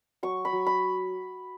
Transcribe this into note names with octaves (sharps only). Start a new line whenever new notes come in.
F#3 C#6
B5
F#3
B5